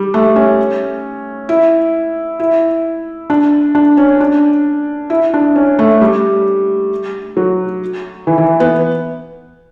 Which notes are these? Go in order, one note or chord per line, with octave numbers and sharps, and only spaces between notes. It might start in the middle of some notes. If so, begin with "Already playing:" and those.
Already playing: G3
A3
C#4
E4
E4
D4
D4
C#4
D4
E4
D4
C#4
A3
G3
F#3
E3
E3
B3